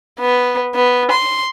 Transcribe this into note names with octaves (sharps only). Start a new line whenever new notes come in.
B3
B3
C6